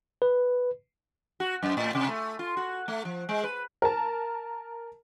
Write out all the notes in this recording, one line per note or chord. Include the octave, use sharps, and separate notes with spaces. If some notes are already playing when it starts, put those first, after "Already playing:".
B4
F#4
F#2
A2
C3
A3
F4
F#4
A3
F3
G#3
B4
A#4 A5